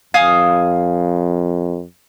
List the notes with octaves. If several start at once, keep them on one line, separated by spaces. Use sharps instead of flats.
F2 F5 G#5 D#6